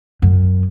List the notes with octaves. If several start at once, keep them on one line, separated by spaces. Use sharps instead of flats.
F#2